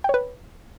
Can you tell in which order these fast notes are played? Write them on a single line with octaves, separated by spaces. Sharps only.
G5 C#5 B4